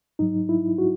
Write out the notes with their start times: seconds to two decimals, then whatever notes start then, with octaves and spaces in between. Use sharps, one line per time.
0.19 G#2 F#3 D#4
0.49 E4
0.78 F#4